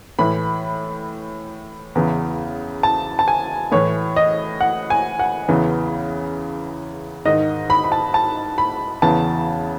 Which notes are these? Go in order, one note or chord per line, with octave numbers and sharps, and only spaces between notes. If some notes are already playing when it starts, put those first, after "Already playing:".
A2 E3 B5
E2 C#3 E3
A5
A5
G#5
A2 E3 C#5
D#5
F#5
G#5
F#5
E2 C#3 E3
G#2 D#3 D#5
B5
B5
A5
A5
B5
E2 C#3 E3 A5